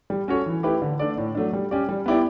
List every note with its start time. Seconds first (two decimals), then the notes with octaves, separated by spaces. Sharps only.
0.10 G3
0.28 C#4 F#4 A4 C#5
0.46 E3
0.63 A3 E4 G4 B4
0.82 D3
0.99 A3 D4 A4 D5
1.17 A2
1.35 F#3 A3 D4
1.53 G3
1.71 C#4 G4 D5
1.89 G3
2.06 B3 E4 G4 D5